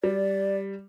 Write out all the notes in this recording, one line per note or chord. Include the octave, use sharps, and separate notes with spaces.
G3 D5